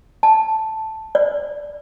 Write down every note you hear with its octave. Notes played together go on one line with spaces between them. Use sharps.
A5
D5